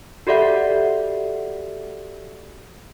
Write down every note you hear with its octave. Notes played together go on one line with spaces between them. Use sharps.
F#4 G4 A4 D5 E5 F#5